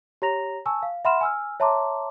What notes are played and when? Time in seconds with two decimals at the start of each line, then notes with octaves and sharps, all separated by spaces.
0.22 G4 C#5 A#5 A#6 F7
0.66 G#5 A5 C#6 E6
0.83 F5
1.05 E5 F#5 B5 C6 F6 E7
1.21 G#5 E6 F6
1.60 C#5 E5 A5 A#5 C6 D6